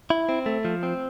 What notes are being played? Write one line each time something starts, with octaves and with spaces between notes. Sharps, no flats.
E4
C4
A3
F3
C4